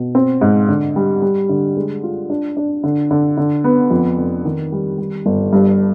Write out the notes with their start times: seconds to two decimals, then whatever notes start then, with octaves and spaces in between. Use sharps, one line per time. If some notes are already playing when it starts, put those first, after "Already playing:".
Already playing: B2
0.15 C4
0.41 G#2
0.69 D3
0.96 G3
1.22 G3
1.49 D3
1.77 G#3
2.03 F4
2.30 D4
2.57 D4
2.84 D3
3.11 D3
3.37 D3
3.64 B3
3.91 F2
4.18 F1
4.45 D#3
4.72 G3
4.98 G3
5.26 G1
5.53 G2